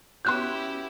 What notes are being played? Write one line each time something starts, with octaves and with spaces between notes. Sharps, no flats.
B3 C#4 E4 F#4 G4 C6 F#6 G6